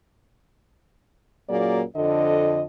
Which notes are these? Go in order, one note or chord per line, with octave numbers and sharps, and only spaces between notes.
F#2 A#2 F#3 A#3 G#4 D5
F2 D3 D#5